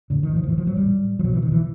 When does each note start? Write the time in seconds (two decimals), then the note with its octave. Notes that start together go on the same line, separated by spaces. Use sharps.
0.10 A2 D3
0.23 D#3
0.36 F3
0.43 D#3
0.48 A2 E3
0.58 F3
0.67 F#3
0.77 G3
0.86 A2
1.19 F3
1.24 B2 F#3
1.34 E3
1.43 D#3
1.52 E3